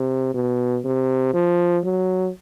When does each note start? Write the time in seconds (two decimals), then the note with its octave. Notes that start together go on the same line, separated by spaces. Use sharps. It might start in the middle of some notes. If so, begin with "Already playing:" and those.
Already playing: C3
0.34 B2
0.84 C3
1.33 F3
1.84 F#3